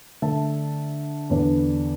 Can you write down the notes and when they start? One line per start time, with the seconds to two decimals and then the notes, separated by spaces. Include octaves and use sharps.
0.22 D3 A3 D4 E5 A5
1.30 E2 D3 B3 D4